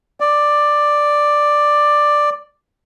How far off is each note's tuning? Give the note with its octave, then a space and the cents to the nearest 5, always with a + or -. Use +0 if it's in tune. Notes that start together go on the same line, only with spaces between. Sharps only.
D5 +5